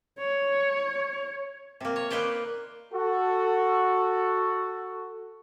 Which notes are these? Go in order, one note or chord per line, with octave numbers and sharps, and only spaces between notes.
C#5
C3 A#3
C#5
A#3 D#4 B4 C5 D5
F#4 A4